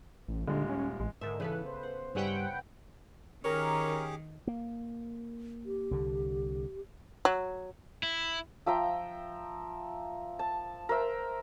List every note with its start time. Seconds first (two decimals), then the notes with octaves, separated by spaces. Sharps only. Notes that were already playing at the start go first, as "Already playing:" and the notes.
0.28 A1
0.48 D#1 D3 G#3
0.69 C#4
1.00 A1 G#3
1.21 G#2 D3 A#4 E5
1.40 C#3 E3 B3 A4 B4
1.66 C5
1.83 F#5
2.15 G2 C#3 G3 C#4 E4 B4 F#5 G5
3.44 D#3 C#4 G4 G#4 A#4 D6
4.47 A#3
5.65 G4
5.91 C2 D3
7.25 F#3
8.03 E4
8.66 F3 E5 G5 A#5
10.39 A5
10.89 A#4 C5 E5